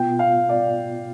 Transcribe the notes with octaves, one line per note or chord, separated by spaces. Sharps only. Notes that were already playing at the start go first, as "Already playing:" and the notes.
Already playing: B2 B3 F4 G5
F5
D5